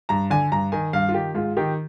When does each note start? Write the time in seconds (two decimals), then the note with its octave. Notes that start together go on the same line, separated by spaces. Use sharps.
0.09 G2 A#5
0.30 D3 G#5
0.52 G2 A#5
0.72 D#3 G#5
0.93 G2 F5
1.09 F4
1.14 D#3 G4
1.35 G#2 F4
1.57 D#3 G4